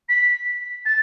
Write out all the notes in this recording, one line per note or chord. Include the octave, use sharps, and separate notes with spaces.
B6
A6